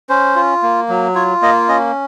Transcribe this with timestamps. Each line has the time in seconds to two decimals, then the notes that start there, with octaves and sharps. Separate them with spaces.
0.09 C#4 C5
0.36 F4
0.63 A#3
0.89 F#3
1.15 F4 C#5
1.42 A#3 D#5
1.69 C#4 D#5